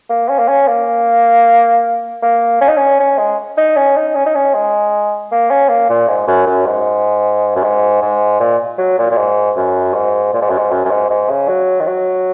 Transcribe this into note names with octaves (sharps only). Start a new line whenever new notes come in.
A#3
C#4
A#3
C#4
A#3
A#3
C#4
D#4
C#4
C#4
G#3
D#4
C#4
D#4
C#4
D#4
C#4
G#3
A#3
C#4
A#3
A#2
G#2
F#2
F#2
G#2
F#2
G#2
G#2
A#2
F#3
A#2
A#2
G#2
F#2
G#2
A#2
G#2
F#2
G#2
F#2
F#2
G#2
G#2
C#3
F#3
D#3
F#3